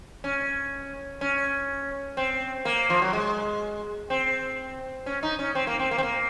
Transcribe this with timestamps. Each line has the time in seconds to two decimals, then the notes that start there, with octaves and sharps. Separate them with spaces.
0.24 C#4
1.21 C#4
2.17 C4
2.65 A#3
2.90 F3
3.02 F#3
3.13 G#3
4.10 C4
5.06 C#4
5.23 D#4
5.39 C#4
5.55 C4
5.67 A#3
5.79 C4
5.91 A#3
5.98 C4
6.03 A#3